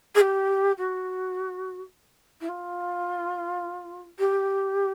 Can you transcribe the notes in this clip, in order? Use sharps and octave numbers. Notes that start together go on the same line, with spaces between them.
G#4
G4
F#4
E4
F4
G4